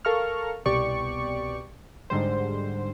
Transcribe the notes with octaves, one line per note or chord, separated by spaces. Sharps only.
A4 A#4 F5 A#5 C#6 F6
C2 B2 G4 D5 C#6
G#2 D3 G3 C5